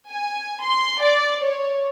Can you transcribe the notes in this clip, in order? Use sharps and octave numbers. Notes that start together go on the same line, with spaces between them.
G#5
C6
D5
C#5